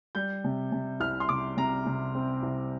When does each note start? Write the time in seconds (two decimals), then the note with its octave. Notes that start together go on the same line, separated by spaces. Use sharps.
0.15 G3 G6
0.44 C3
0.72 C3
1.00 C2 F6
1.20 C6
1.29 C3 D6
1.57 C3 A#5
1.86 C3
2.15 C4
2.43 C2